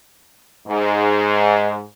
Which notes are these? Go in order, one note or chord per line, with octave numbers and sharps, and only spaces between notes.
G#2